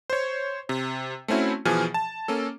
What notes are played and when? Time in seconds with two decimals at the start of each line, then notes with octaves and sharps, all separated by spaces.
0.10 C5 C#5
0.69 C3
1.28 A3 C4 C#4 E4 F#4
1.65 B2 E3 F3 G#4 G#5 F6
1.94 A5
2.28 A#3 C#4 A4